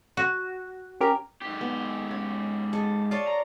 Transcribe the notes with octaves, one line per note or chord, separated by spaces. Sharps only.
F#4
C#4 G4 A#4
G#2 G4
B3
C#4
G#3 A4 D#5
F4 C#5 D5 A5
A#5